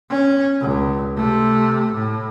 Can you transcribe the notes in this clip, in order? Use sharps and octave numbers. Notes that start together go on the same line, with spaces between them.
C#4
C#2
C3 A3
A2